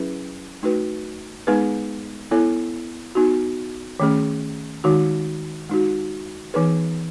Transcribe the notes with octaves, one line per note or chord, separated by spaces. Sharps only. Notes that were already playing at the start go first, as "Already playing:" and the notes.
Already playing: F#3 C#4 E4 G#4 B4
A3 D#4 F#4 B4
G#3 B3 D#4 G#4 B4
B3 E4 A4 C#5
B3 D#4 F#4
D#3 A3 C#4 G#4
D#3 G#3 D#4 F#4
G#3 D#4 F#4
E3 B3 D#4 G#4 B4